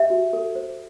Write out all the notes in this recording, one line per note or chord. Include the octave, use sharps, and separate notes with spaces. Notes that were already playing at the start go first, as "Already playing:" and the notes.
Already playing: G4 E5
F#4
A4
C5